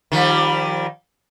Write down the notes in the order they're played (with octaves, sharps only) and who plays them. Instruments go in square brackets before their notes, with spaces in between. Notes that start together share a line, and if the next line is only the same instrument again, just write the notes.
[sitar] D#3 F3 G3